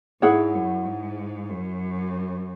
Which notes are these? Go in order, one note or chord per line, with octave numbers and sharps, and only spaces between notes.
G#2 E4 G#4 C#5 F#5
F#2
G#2
F#2